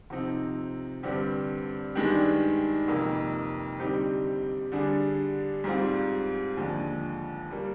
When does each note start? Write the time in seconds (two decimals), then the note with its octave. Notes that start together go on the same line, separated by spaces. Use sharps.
0.10 C3 F3 C4 D#4
1.03 G2 D3 G3 C4 G4
1.95 G2 D#3 G#3 D4 G4
2.88 F2 C3 D#3 A#3
3.80 D3 G3 C4 D#4 G4
4.72 D3 G3 D4 G#4
5.64 G#2 G3 C4 F4
6.57 D#2 D3 F3 G#3
7.51 G3 A#3